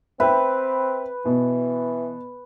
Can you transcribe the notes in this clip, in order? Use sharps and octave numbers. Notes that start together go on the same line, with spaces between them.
C4 B4 E5 G5
B2 E3